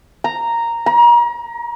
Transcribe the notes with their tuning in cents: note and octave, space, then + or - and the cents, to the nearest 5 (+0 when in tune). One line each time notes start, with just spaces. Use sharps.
A#5 -5
A#5 +35